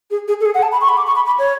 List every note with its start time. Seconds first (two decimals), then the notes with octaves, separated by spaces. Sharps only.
0.11 G#4
0.28 G#4
0.41 A4
0.45 G#4
0.54 F#5
0.62 A5
0.72 B5
0.81 C#6
0.89 B5
0.97 D6
1.07 C#6
1.16 B5
1.26 B5
1.39 C#5